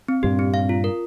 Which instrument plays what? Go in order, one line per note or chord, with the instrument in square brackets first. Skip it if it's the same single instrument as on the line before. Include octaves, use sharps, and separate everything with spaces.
[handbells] C4
[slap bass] G2 A#2 [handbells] G4
[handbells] C4
F5
F4
A#4